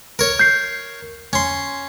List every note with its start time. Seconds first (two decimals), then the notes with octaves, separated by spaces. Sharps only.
0.19 A#4 C#5
0.39 G6 C7
1.33 C#4 C6